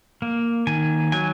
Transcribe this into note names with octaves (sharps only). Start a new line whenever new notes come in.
A#3
D#3 G#5
F#3 G#5